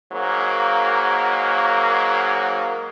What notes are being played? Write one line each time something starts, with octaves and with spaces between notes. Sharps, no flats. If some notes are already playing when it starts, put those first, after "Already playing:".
G#2 F#3 A#3